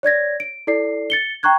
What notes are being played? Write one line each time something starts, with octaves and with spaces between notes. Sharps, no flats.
C#5 D5 G#6 A#6
D7
E4 A4 D5 C7
A6 C#7 G7
G5 A#5 C#6 F#6 G#6